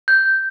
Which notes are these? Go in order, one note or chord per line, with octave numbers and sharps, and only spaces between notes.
G6